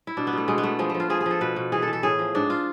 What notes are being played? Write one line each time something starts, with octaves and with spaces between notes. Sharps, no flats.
E4
B2 D4
B3
B2 A3
B2 G#3
B3
B2 A3
F3 G#3
F3 A3
F4
F3 G#4
G#4
F3 A4
B2 B4
B2
E3 G#4
A4
E3
A4
A2 G#4
F3
G#2 D4
F4